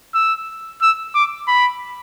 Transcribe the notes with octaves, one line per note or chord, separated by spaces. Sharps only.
E6
E6
D6
B5